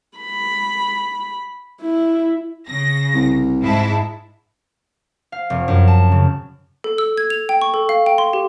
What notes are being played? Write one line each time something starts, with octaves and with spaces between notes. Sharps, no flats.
B5
E4
C#3 A#6
C2
G#2 E4 A5
F5
F1
F#2
A5
C#3
A4
E6
G#6
F7
G5
C#6
A4
F5
G5
C6
G4